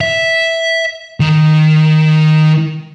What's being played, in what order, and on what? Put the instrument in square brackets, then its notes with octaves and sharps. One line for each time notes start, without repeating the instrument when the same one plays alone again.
[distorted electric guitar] E5
D#3